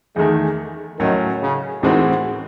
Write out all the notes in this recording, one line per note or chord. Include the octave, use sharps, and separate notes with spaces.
E2 D#3 G#3 A3
A2 D#3 F#3 C#4
C#3
A2 D#3 E3 G#3 C4 F#4